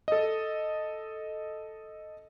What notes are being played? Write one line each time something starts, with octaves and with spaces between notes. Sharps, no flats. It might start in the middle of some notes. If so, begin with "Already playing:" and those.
A4 D#5